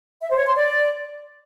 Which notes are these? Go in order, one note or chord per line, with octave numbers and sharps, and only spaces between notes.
E5
C5
C#5
C6
D5